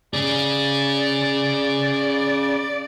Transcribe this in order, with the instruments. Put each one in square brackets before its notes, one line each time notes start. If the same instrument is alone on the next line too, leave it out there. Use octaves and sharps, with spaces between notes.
[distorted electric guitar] C#4 G#4 [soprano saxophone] D5